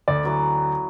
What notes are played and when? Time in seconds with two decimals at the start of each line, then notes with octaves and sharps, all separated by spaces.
0.08 D2 D5
0.23 E3 F#3 B3